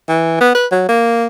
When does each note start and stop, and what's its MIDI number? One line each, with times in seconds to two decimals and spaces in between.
0.08 0.39 52
0.41 0.52 59
0.55 0.66 71
0.71 0.84 54
0.89 1.26 58